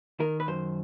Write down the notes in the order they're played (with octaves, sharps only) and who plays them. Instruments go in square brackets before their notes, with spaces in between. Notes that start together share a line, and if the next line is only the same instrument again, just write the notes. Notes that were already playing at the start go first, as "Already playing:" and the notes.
[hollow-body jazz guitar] D#3 A#4
B4
F#2 C5